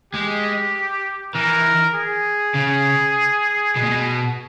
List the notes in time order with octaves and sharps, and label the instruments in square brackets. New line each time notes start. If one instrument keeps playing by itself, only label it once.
[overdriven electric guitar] G#3 [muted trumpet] G4
[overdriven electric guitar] E3 [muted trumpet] A#4
[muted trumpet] G#4
[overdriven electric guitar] C#3
B2
A#2
B2